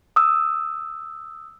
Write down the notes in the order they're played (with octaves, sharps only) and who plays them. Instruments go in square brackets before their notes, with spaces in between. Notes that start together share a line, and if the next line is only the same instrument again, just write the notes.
[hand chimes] D#6 E6